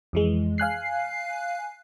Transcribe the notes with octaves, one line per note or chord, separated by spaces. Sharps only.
F2 E3 G#3
F5 G#5 F#6 C7